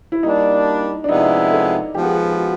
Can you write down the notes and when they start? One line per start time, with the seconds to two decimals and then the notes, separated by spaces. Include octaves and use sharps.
0.12 E4
0.23 G3 A#3 D4 D#4
1.04 D4
1.09 C3 F3 G#3 B3 D#4 E4
1.52 A4
1.95 F3 G#3 B3 G4
2.05 G#4
2.16 G4
2.31 G4
2.37 F#4